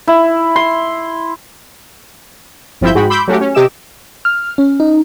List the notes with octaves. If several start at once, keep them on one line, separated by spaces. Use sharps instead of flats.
E4
C6
G1 F3 C4 E4 E5 G6
G#2 G#3 F#4 G5 B5
B5 C6 D6 E6 G6
F#3 A3 C#4 F#4 G4
C#4
C3 G4 D#5 D6 E6 E7
F6
C#4
D#4